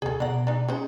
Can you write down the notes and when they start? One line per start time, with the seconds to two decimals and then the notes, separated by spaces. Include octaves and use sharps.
0.02 D2 C3 G#4 A4
0.20 B2 D4 F#5 A#5
0.47 D4 D#4
0.68 G#3 C#4 C5